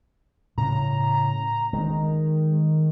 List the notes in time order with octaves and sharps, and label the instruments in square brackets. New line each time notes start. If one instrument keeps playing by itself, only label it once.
[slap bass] A2 C#3 [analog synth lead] A#5
[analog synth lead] D#3 [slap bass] G#3